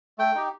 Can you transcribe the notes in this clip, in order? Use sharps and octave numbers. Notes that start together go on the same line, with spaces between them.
A3 G5
D#4 G4